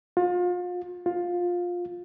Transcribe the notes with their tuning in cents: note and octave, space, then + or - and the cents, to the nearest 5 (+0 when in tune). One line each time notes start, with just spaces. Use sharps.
F4 +35
F4 +15